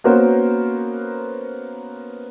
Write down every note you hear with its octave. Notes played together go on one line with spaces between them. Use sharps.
A#3 B3 C#4 F#4 A#4 C5